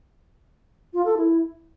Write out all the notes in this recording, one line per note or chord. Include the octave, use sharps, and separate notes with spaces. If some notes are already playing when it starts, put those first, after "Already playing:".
F4
A4
E4